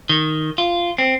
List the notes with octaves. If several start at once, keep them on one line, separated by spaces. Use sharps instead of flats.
D#3
F4
C4